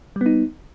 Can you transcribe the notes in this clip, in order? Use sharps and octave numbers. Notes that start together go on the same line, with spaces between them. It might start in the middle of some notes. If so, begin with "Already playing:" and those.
G3 B3 D#4